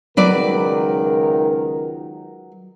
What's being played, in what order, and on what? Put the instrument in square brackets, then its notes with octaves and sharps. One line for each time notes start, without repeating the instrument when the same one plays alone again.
[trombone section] C#2 D#3 A#4 [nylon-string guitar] F#3 B4 D5